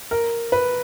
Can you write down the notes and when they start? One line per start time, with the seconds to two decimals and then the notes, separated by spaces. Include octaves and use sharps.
0.11 A#4
0.52 B4